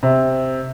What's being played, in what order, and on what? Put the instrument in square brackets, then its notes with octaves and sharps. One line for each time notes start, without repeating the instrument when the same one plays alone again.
[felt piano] C3